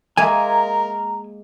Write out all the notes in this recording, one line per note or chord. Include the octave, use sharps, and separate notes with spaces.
G#3 A#3 A#4 E5 G#5 A#5